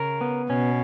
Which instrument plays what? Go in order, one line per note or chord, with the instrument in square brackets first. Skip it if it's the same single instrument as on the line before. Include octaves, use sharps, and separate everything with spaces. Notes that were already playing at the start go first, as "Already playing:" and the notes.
Already playing: [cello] C#3 [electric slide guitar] A#4
[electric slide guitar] B3
[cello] B2 [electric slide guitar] C#4